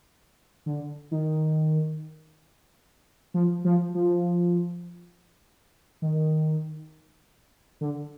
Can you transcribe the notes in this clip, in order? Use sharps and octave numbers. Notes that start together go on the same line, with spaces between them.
D3
D#3
F3
F3
F3
D#3
D3